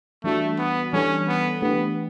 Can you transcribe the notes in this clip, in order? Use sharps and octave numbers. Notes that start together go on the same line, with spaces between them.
E3 G3 A3 D4 F#4
B3
E3 G3 C#4 D4 A4
B3
E3 A3 B3 D4 G4 B4